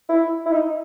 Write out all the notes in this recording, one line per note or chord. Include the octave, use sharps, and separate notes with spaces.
E4
E4
D#4